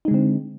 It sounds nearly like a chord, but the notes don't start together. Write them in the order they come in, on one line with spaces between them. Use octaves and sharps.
D#4 G#3 D3 C4